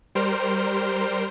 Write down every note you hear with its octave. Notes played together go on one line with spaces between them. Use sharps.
G3 A#4 C5 C6 F6 D7